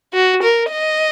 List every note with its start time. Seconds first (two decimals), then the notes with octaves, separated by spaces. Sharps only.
0.14 F#4
0.42 A#4
0.72 D#5